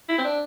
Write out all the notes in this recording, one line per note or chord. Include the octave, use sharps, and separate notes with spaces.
E4
C4
D4